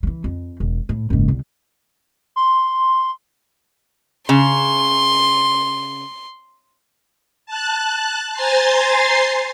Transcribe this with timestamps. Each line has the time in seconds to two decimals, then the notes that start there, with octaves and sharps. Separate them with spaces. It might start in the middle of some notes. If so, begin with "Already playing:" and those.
0.03 E3 G3
0.24 F2
0.60 E1
0.89 A2
1.10 F#1 G#2
1.28 C2
2.36 C6
4.29 C#3 C6
7.46 A5 F#6
8.33 C5 G#5 A#5 C6 A6 C7